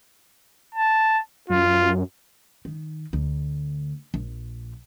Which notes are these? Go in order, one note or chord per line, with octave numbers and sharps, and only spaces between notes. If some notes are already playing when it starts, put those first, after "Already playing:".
A5
F#2 F4
D#3
D2
A#1